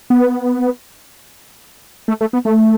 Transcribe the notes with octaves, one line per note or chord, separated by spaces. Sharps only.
B3
A3
A3
B3
A3